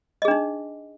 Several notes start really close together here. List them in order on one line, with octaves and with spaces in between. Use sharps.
D#5 G#4 D4 D#4